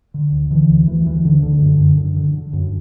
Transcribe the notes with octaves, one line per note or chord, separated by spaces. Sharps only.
D3
D2
D3 E3
D2
D2 E3
D2 E3
D2 D3
D2 D3
F#2
F#2
D3
D3
D3
F#2